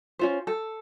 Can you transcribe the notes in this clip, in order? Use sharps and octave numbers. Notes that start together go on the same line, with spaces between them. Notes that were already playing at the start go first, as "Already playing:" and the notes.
C#4 F4 C5
A4